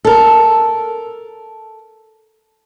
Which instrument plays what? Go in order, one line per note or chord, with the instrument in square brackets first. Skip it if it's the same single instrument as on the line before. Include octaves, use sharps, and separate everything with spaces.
[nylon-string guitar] A4 A#4